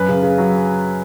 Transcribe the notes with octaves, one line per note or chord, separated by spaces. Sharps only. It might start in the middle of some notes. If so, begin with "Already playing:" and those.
Already playing: F#2 B4
C#3
C#3
F#3